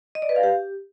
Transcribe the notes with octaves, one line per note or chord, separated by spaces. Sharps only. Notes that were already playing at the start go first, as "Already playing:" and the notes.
D#5
D5
B4
F5
G4